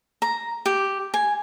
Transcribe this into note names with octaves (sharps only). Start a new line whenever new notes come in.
A#5
G4
G#5